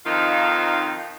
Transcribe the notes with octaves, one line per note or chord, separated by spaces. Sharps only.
F2 D#3 F3 D#4 F4 F5